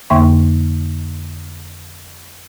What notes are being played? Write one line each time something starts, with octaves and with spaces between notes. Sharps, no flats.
F2 D3 A#3 E5 C6 C#6